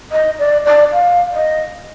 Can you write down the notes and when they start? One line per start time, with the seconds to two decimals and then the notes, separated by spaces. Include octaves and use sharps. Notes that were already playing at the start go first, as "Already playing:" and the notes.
0.12 D#5
0.39 D5
0.66 D5
0.93 F5
1.33 D#5